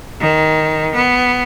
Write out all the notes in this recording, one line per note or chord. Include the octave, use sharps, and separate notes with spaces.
D#3
B3